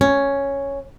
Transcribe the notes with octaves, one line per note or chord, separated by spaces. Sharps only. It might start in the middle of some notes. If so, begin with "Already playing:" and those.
C#4